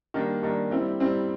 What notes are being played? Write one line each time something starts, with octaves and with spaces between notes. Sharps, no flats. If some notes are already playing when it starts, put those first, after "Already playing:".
D#3 G3 A#3 D4
D#3 G3 A#3 D4
G3 C4 E4 G4
G3 C4 E4 G4